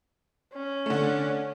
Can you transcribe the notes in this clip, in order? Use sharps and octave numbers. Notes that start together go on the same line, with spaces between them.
C#4
D3 A3